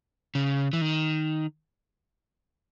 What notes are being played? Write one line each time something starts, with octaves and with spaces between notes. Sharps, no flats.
C#3
E3
D#3